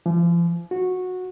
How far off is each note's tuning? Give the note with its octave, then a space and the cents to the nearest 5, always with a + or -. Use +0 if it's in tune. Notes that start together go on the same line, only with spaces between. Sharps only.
F3 -40
F#4 -15